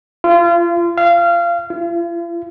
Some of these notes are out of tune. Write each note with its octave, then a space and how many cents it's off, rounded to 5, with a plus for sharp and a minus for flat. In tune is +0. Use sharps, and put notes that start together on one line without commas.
F4 -30
F5 -25
F4 -45